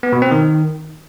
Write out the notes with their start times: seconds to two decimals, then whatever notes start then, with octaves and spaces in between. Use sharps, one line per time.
0.03 B3
0.13 B2
0.22 C4
0.31 D#3